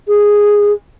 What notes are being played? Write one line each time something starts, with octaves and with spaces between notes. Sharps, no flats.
G#4